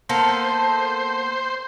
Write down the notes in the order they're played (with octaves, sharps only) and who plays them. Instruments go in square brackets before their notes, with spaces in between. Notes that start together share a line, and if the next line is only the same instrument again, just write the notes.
[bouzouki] A#3 B3 A4 [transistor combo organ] C5